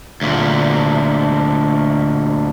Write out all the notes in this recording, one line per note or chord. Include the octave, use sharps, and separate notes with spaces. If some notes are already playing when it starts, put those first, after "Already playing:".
D2 A#2